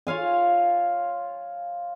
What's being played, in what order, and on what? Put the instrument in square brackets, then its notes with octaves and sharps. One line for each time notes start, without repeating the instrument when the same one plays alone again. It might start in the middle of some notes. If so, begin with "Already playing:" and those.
[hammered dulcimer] F4 C#5 F5 G#5